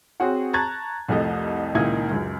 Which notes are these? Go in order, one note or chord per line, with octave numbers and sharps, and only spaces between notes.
C4 F#4 G#4 C#5 F#5
A5 A#5 C#6 F#6 G#6 A6
C2 F2 A3 D#5
C#2 A#2 D#3 D#4 E4 G#6
C#2 F#2